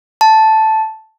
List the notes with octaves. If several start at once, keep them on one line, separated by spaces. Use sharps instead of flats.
A5